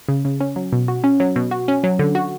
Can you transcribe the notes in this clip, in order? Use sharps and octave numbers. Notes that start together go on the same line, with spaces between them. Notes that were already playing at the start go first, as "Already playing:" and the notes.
C#3
C#3
C#4
F#3
B2
F#4
C#4
F#3
B2
F#4
C#4
F#3
D3
F#4